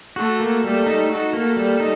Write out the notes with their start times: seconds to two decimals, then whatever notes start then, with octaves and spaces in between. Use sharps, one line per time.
0.16 A3 F#4 A4
0.40 A#3
0.64 G3 A3 A4
0.86 D#4
1.10 A3 F#4 A4
1.33 A#3
1.57 G3
1.80 D#4